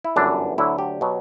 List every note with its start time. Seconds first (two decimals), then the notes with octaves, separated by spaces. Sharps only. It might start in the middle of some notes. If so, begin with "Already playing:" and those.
0.04 E4
0.16 G1 F#2 E3 D4
0.58 D2 D3 F#3 E4
0.78 G4
1.01 B2 F#3